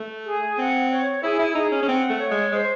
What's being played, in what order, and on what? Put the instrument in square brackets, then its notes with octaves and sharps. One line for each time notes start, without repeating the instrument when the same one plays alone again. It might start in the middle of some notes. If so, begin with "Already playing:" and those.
Already playing: [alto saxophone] A3
[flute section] G#4
[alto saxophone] C4 [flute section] F#5
[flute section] C#5
[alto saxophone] E4 [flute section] G#4
[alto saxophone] E4
[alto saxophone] D#4 [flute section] G#4
[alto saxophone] C#4
C#4
[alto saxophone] C4 [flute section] F#5
[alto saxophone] A3
[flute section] C#5
[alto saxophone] G#3
[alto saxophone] G#3 [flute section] C5